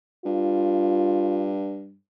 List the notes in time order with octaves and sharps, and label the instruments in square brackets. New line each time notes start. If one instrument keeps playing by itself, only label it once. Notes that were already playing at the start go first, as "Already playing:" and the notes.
[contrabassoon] G2 [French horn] F4